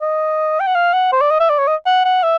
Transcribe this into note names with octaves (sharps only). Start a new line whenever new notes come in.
D#5
G5
F#5
F5
F#5
C5
D5
D#5
E5
D5
C#5
D#5
F#5
F#5
E5